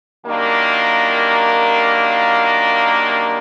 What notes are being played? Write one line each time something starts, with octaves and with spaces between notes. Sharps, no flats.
F#2 D#3 G3 A#3 D4